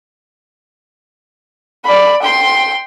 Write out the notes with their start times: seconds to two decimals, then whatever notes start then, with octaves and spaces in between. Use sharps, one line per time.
1.84 D5 B5
2.22 G5 C6